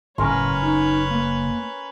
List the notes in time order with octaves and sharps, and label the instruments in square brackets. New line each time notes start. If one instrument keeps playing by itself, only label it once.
[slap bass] F#1 [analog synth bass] A2 [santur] C#4 A#4 C6 [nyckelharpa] B4 C#5
[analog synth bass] D#4
A#3